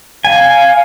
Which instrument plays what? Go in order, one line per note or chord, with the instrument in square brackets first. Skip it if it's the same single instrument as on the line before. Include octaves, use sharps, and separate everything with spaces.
[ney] F5 [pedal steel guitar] G#5